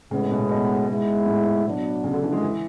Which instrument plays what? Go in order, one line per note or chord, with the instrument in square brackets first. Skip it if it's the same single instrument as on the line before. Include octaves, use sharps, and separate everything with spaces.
[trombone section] A2 G#3 B3 [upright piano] C#3
[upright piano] B2
B2
[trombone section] G#2 G#3 B3 E4
[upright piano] A2
[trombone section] B2 F#3 B3 D4
[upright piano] C#3
D3
E3
G#3
E3